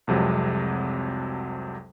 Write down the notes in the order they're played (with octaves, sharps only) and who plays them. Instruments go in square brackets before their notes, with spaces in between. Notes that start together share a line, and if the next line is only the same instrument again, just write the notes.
[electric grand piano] C2 F2 C3 F#3 G#3